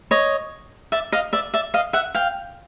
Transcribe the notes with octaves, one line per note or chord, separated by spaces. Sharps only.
C#5 D#5
D5 E5
D#5 F5
D5 E5
D5 E5
D#5 F5
E5 F#5
F5 G5